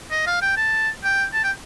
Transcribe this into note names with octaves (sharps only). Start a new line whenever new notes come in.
D#5
F5
G5
A5
G5
A5
G5